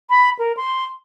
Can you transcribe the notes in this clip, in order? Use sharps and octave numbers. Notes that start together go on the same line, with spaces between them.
B5
A#4
C6